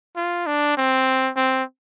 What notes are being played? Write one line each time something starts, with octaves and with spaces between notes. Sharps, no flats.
F4
D4
C4
C4